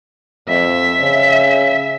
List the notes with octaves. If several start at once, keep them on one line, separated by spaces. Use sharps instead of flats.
F2 E5
C#3